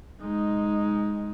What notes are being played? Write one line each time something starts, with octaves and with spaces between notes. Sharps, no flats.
G#3 D#4